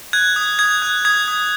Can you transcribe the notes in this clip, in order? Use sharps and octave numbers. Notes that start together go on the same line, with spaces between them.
F#6 G#6
D#6
D#6 G#6
F#6
D#6 G#6
D#6